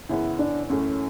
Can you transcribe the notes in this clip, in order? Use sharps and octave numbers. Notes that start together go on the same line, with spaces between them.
F#2 C#3 E3 B3 E4
D4
F#2 E3 A3 C#4